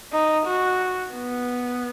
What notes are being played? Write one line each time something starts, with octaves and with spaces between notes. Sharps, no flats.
D#4
F#4
B3